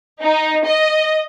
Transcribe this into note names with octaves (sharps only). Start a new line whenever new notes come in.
D#4
D#5